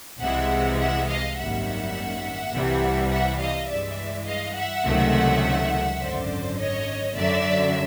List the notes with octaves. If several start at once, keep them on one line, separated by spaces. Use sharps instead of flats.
C2 C3 E3 G#3 E5 F#5
E5 F#5
D#5 F5
G#1 F#2 D#3 G3 A#3 E5 F#5
C2 C3 E3 G3
E5 F#5
D#5 F5
G2 E3 G#3 D5 E5
D#5 F5
E5 F#5
C#2 C3 D#3 F#3 A3
G#1 F#2 D3 C5 D5
C#5 D#5
F#2 D3 F#3 D5 E5